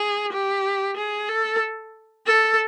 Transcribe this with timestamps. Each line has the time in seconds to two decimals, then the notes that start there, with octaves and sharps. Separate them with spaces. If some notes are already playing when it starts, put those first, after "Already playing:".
Already playing: G#4
0.32 G4
0.97 G#4
1.29 A4
2.27 A4